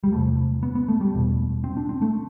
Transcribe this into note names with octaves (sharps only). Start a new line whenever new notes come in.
G3
E2 C3 A3
B3
B3
A3
G3
E2 B2
C4
D4
C4
A3